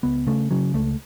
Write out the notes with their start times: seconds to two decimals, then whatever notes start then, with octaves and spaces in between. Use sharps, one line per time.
0.03 C#2 B3
0.27 C#3 A3
0.51 C#3 F#3
0.74 C#2 A3